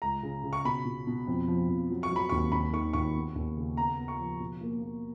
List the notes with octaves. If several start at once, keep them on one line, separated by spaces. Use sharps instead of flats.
C#2 A#5
C#3
C#3
C#6
B2 B5
B2
B2
F2
F3
F2
F#3
C#6
F#3 B5
D#2 C#6
D#2 B5
D#3 C#6
D#2 C#6
B3
D#2
C#3
B3 A#5
B3
C#6
F3
B2
A#3
A#3